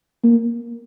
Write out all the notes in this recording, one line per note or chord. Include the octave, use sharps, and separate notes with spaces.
A#3